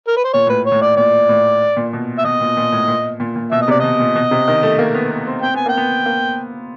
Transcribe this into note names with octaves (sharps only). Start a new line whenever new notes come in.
A#4
B4
C5
A#2 C#5
A2 B4
C#5
A2
D5
A#2 D5
A2
A#2
B2
E5
B2 D#5
A#2
A#2
A2
A#2
A#2
A#2
B2 E5
D#5
C3
D5
B2 D#5
A#2
B2
C3
D#3
A3
A#3
B3
B3
C4
C4 G5
B3 G#5
A#3 G5
B3
A#3